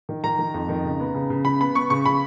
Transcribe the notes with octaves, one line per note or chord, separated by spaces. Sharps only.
D#3
D#3 A#5
D#3
F2
D#3
C#3
B3
C#3
C#3
C#3 B5
B3 B5
B3 C#6
C#3 C#6
C#3 B5